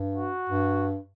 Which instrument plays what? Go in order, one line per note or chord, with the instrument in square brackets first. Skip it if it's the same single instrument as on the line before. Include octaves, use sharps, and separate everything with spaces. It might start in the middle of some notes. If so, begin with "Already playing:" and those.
Already playing: [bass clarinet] G2
[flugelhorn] F#4
[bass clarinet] G2